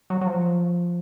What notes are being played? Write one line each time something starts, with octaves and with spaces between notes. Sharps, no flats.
F#3
F#3
F3